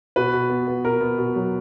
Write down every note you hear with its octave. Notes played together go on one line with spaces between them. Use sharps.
B2 B4
B2
B3
B3
B2 A#4
B3
B2
F#3